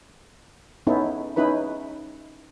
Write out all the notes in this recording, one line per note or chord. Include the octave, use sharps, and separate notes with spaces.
B3 C#4 D#4 E4 A4
C#4 D#4 E4 B4 B5